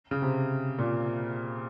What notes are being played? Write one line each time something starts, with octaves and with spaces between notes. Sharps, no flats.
C#3
C3
A#2